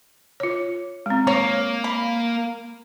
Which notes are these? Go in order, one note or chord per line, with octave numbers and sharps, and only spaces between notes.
F4 C#5
G#3 C4
A#3 C#5
B5